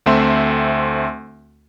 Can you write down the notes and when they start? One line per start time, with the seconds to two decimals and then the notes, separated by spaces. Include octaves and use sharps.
0.06 D2 A3 C4 E5 C6